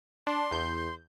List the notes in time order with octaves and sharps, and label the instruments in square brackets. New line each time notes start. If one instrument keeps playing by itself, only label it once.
[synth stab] D4 [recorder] C6
[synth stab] E2 G6